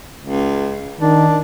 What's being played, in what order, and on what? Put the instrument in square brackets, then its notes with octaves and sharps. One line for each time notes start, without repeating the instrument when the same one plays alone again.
[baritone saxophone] C#2
[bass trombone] D#3 [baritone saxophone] D4